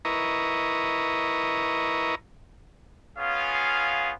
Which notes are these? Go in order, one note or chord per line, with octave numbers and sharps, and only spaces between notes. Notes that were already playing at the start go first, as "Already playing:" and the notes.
E4 A#4 B4 D#5 A#5 C#6
B3 C#4 F4 G#4 F5